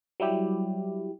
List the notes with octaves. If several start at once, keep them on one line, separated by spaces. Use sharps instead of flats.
F#3 G3 E4 G4